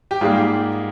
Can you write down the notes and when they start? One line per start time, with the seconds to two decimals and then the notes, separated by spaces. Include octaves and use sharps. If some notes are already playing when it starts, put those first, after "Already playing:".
0.11 G4
0.21 G#2 G3 A#3 F4 G#4
0.37 G4